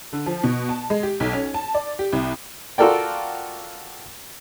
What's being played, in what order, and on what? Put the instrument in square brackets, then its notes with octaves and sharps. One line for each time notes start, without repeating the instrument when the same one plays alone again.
[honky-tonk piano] D3
F3
B2
A5
G#3
G4
B1
C#4
A5
D5
G4
C2
[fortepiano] F4 F#4 A4 A#4 D5 G5